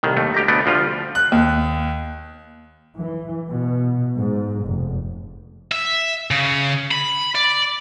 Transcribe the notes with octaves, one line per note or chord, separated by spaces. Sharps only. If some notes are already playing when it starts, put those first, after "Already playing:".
C2 A2 D#3
D#2 A3
D2 G4 A#5
D2 A3 B3 D5
D2 F3 G3 F4
F#6
D#2
E3
B2
G#2
F1
E5
C#3
B5
D5